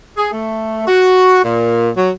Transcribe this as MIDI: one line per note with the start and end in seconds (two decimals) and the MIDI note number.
0.16 0.28 68
0.31 0.83 57
0.86 1.40 66
1.44 1.89 46
1.96 2.10 54